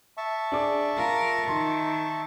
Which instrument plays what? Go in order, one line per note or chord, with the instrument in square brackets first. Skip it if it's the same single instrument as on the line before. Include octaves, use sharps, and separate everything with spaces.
[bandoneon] E5 A5 C#6
[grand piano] D4 G#4 D6
[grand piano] F4 [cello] A#4
[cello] D#3 [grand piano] C6